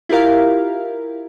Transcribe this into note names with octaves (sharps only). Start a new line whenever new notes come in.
E4 F4 G4 A#4 F5